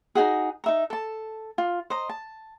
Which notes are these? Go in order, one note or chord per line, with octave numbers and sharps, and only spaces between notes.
D#4 E4 F#4 G#4
D#4 E5 A#5
A4 A5
F4
C5 D#5 A#5
A5